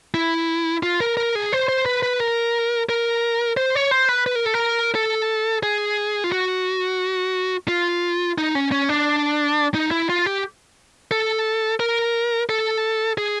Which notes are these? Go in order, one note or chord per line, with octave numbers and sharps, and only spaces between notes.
E4
F4
A#4
A#4
G#4
C5
C5
B4
B4
A#4
A#4
C5
C#5
C5
B4
B4
A#4
A4
A#4
A4
G#4
F4
F#4
F4
D#4
C#4
C#4
D4
D#4
E4
F4
G4
A4
A#4
A4
G#4